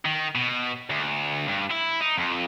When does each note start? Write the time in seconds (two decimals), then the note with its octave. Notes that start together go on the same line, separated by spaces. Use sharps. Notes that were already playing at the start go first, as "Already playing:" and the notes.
0.05 D#3
0.35 B2
0.90 D2
1.48 G2
1.71 E4
2.01 D#4
2.17 F2